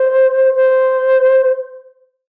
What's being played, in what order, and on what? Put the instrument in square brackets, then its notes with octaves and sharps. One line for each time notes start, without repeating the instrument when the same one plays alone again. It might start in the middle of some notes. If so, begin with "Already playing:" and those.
Already playing: [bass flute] C5
C5